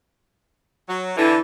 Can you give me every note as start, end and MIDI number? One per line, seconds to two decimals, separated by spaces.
0.89 1.12 54
1.17 1.36 50
1.17 1.36 52
1.17 1.39 64